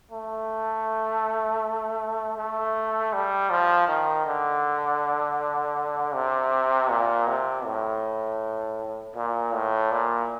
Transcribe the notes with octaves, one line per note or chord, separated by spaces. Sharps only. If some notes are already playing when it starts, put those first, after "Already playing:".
A3
A3
G3
F3
D#3
D3
C3
A#2
C3
A2
A#2
A2
A#2